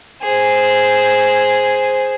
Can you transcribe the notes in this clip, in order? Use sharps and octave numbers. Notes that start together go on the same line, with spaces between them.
G#4 C5